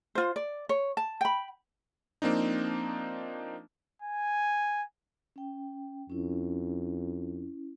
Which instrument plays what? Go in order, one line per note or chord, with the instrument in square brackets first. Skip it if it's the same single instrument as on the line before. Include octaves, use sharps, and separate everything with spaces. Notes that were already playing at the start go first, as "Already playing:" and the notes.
[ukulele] F4 C5
D5
C#5
A5
G5 B5
[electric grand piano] F3 A#3 C4 D4 D#4
[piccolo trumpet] G#5
[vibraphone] C#4 G5
[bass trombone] F2 [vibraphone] C#4 E4